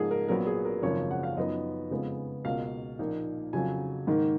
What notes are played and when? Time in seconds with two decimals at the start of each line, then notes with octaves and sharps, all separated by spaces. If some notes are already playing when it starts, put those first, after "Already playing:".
Already playing: G#2 F3 A#3 G#4
0.11 A#4
0.28 A#1 A#2 F#3 B3 A#4
0.47 G#4
0.65 A#4
0.82 G#1 F#2 C#3 F3 A#3 C#5
1.11 F#5
1.23 F5
1.37 F#2 F3 B3 D#4 D#5
1.91 F2 C#3 G#3 B3
2.45 C#2 B2 A#3 F5
2.99 A#1 A#2 F3 A#3 D#4
3.53 F2 C#3 F#3 G#5
4.07 G#2 D#3 A#3 D#4